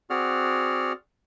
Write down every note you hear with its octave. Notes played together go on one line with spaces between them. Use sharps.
C4 F#4 G#4 D5 F#5 F6